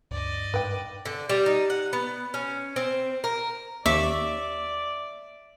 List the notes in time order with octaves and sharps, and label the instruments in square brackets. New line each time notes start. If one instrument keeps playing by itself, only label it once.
[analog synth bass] D2 [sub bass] G2 [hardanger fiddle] D5 D#5
[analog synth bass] G#2 [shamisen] B4 G5
[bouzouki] D3
G3
D#4
F#5
B3
C#4
C4
A#4
[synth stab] D#2 C#6 D6 [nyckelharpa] D5 [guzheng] E5